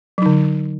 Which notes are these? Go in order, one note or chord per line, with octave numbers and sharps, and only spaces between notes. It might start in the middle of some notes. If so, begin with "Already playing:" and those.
D3 F#3 D#4